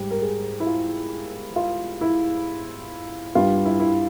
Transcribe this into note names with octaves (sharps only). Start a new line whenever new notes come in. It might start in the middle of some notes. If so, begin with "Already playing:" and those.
Already playing: G#2 G3
A#4
G#4
E4
F4
F4
E4
G2 G3 F4
E4
E4